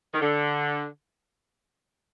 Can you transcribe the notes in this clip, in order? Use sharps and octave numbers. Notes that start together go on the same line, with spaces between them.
D#3
D3